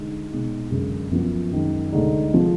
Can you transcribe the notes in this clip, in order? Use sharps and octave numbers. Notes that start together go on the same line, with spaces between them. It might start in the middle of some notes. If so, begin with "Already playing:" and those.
Already playing: D3 G#3 D#4
B2 G#3 D#4
F#2 D3 G#3
F#2 F3 B3
F#2 D#3 G#3
D2 D3 G#3 D#4
F3 G#3